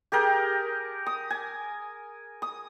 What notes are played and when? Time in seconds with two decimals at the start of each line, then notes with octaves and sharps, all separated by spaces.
0.12 G4 G#4 A#4 G5
1.06 D#6
1.30 G#5
2.42 D#6